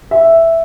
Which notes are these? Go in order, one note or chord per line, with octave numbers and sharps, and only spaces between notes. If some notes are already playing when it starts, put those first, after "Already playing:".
E5